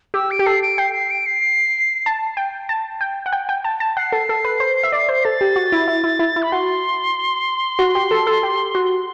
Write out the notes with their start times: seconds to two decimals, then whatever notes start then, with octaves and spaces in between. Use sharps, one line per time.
0.14 G4 E6
0.31 D7
0.39 G4
0.46 A4 C7
0.62 D7
0.78 G5 C7
0.94 C7
1.11 D7
1.26 C7
2.06 A5
2.37 G5
2.69 A5
3.01 G5
3.26 F#5
3.33 G5
3.49 G5
3.64 A5
3.80 A5
3.97 F#5 C7
4.12 A4
4.29 A4
4.45 B4
4.60 C5
4.83 E5
4.92 D5
5.09 C5
5.24 A4 A6
5.41 G4
5.56 F#4
5.72 E4
5.88 E4
6.04 E4
6.19 E4
6.36 E4
6.43 B5
6.52 F#4 C6
7.79 F#4
7.95 G4
8.11 A4
8.27 A4
8.43 G4
8.75 F#4